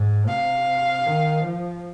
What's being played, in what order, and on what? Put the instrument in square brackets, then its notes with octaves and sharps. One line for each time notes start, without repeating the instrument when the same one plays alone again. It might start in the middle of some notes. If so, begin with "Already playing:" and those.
Already playing: [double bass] G#2
[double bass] C3 [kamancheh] F5
[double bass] D#3
F3